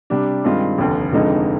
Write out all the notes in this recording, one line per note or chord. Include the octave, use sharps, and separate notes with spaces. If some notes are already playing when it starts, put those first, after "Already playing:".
C3 G3 D4
G2 D#3 G#3 C4 F4
F1 D#2 D3
F1 F2 D3 G#3 D#4